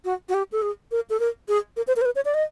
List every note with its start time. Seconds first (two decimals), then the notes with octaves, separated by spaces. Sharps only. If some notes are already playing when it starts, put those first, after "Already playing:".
0.05 F#4
0.29 F#4
0.34 G4
0.52 A4
0.62 G#4
0.92 A#4
1.10 A4
1.20 A#4
1.48 G#4
1.77 A#4
1.87 C5
1.96 A#4
2.01 C5
2.05 B4
2.15 C#5
2.25 D5
2.34 D#5